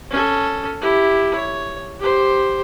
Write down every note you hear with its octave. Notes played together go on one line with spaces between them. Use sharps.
C#4 A4
E4 G4
C#5
G4 C5